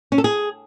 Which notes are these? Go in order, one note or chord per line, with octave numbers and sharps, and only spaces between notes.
C#4
A4
G#4